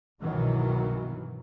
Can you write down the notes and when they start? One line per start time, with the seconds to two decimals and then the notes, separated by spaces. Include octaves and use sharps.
0.21 C2 G2 B2 D#3 E3 F#3